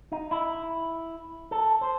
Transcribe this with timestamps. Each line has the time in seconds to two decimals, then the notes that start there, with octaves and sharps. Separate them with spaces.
0.12 D#4
0.31 E4
1.51 A4
1.81 C5